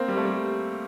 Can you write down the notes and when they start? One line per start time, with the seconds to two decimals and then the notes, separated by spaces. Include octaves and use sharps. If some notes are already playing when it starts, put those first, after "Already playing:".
Already playing: A#3 C4
0.08 G3
0.17 A3
0.25 G3